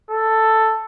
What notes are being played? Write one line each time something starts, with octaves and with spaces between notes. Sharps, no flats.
A4